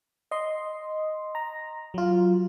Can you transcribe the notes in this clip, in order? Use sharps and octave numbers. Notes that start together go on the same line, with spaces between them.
D#5 C6
A#5
F#3 F4